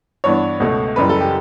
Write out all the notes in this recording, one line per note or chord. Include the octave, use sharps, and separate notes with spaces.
G2 E3 B3 D4 C#5
C#2 B2 A3
F#1 F#2 C#3 E3 G3 B4
A4
G4